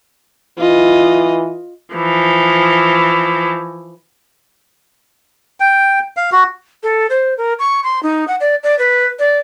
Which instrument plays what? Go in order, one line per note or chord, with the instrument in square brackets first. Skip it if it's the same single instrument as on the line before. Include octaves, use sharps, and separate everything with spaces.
[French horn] E3 [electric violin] F4 D#5
[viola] E3 F3
[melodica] G5
F5
F#4
[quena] A4
C5
A#4
C#6
C6
D#4
F#5
D5
D5
B4
D5